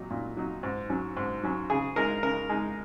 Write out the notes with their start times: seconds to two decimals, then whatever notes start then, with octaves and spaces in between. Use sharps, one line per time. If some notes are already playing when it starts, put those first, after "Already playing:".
Already playing: A#2 F#3 D#4
0.10 A#2
0.37 F#3 D#4
0.63 G#2
0.90 F#3 C#4
1.17 G#2
1.43 F#3 C#4
1.70 C#3 G#4
1.96 G#3 D#4 A#4
2.23 C#3 A#4
2.49 G#3 D#4